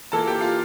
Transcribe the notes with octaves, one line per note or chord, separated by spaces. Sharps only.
E3 A#3 F4 A4 A5
G4 G5
F4 F5